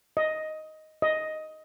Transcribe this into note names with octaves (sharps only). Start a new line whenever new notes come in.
D#5
D#5